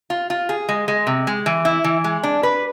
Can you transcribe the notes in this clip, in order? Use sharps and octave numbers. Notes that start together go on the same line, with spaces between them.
F4
F4
G#4
G#3
G#3
C3
G#3
E3
E4
E3
G#3
D4
B4